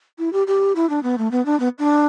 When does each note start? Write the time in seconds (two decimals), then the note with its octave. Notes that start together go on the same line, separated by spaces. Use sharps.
0.19 E4
0.33 G4
0.47 G4
0.75 E4
0.90 D4
1.03 B3
1.18 A3
1.31 B3
1.46 D4
1.60 B3
1.79 D4